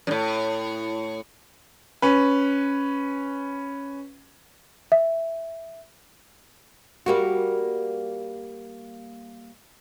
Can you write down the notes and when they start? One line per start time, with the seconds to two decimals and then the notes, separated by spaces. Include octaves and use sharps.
0.07 F#2 A2
2.02 C#4 B4
4.92 E5
7.06 G3 A#3 F#4